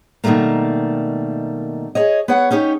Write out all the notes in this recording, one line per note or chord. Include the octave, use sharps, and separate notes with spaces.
B2 D#3 F#3 G3 A3 A#3
G#4 C#5 D#5
B3 C#5 F#5
C#4 D#4 G4 C#5